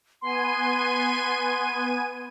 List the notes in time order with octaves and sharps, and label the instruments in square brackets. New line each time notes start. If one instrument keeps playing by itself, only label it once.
[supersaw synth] B3 G#5 D#7 [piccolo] C6